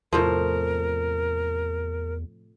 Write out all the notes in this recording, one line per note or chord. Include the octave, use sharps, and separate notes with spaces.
E2 A2 C3 F3 A#4